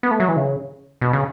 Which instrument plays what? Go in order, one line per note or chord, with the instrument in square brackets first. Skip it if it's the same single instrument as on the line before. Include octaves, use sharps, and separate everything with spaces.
[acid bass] B3
A3
F#3
E3
C#3
B2
C#3